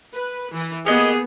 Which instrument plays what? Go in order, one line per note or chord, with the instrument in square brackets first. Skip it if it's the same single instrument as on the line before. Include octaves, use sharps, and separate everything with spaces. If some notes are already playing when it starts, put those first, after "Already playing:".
[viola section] B4
E3
[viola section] A#3 B3 G4 [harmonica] G#4 [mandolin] C#5 D#5